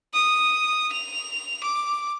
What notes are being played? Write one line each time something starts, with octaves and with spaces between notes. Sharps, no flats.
D#6
F7
D6